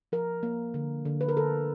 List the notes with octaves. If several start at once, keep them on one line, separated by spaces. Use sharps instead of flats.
F3 A#4
A#3
D3
D3
B4
A#4
D3 A4